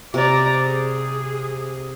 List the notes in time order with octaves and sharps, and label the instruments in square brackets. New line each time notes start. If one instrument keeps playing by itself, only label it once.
[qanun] C3 [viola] D5 A#5
[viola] G#4